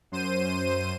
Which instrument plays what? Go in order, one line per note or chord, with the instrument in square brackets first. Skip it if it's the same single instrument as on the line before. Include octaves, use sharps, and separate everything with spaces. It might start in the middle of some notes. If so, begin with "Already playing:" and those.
[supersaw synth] F#2 C5 D#7